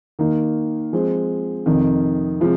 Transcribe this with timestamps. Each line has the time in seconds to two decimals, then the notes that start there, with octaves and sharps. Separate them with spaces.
0.19 D#3 A#3 D#4
0.93 F3 G#3 C4
1.66 F2 C3 D#3
2.40 C3 F3 G#3